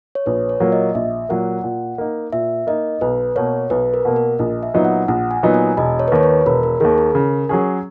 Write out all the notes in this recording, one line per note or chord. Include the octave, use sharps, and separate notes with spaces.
C#5
A#1 B4
C#5
A#2 F#3 A#3
D#5
A#1 E5
A#2 F#3 A#3 F#5
A#2
A#3 D#4
A#2 E5
A#3 D#4 D#5
B1 B4
B2 A#3 C#5
B1 B4
A#4
B2 A#3
A#4
A#1 D#5
E5
A#2 F#3 B3 D#4
F#5
A#1 F#5
G#5
A#2 F#3 B3 D#4
G#5
E1 D#5
C#5
B4
D#2 D#3 C#5
B4
E1 A#4
A#4
D#2 D#3 G#4
A#4
C#3
F#3 C#4 G#4